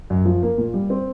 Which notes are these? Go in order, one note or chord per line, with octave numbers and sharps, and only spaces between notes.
F#2
F3
A#3
A#2
G3
C4